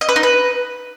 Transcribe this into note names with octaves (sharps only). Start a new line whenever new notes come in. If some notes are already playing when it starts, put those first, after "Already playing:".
D#5
B4
D#4
B4